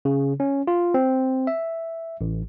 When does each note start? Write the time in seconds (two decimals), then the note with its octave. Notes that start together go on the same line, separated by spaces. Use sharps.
0.05 C#3
0.40 C#4
0.67 F4
0.94 C4
1.47 E5
2.21 A1